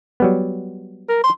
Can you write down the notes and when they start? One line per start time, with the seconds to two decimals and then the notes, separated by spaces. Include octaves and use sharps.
0.20 F#3 G3 B3
1.09 A#4
1.24 C6